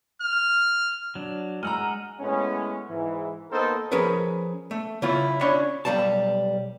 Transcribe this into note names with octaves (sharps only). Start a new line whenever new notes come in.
F6
F#3 D4
G#3 D#5 F#5 A#5 E6 F6
A2 G#3 B3 C#4
G#2 E3
A#3 B3 D#4 A4 A#4 C5
F3 C#4 G#4 A#4 B4
A3
C#3 C#4 E4 F4
C#4 D4 C#5 B5
B1 E2 G3 F5 A5